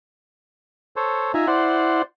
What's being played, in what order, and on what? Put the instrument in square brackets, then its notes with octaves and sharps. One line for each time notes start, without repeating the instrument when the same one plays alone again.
[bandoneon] A4 C5 C#5
[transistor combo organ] D#4 F4 [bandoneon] E5 G#5 A#5
[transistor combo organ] E4 F#5 [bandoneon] C5 D5 C6